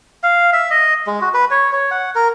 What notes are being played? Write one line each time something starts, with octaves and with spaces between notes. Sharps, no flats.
F5
E5
D#5
G#3
F#4
B4
C#5
C#5
F#5
A#4